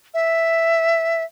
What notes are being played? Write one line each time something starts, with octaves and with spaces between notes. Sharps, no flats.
E5